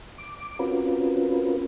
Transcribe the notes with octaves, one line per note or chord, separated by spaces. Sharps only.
D6
C4 C#4 F4 F#4 A#4 B4